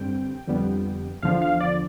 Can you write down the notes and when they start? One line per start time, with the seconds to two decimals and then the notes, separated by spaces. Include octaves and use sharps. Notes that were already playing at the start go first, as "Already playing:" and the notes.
Already playing: G2 D3 G3 C4 G5
0.47 F2 D3 G3 B3
1.22 E2 D3 F3 F5
1.42 F5
1.60 D5